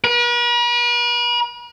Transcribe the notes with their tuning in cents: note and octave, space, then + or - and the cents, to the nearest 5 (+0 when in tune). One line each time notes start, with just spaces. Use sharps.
B4 -45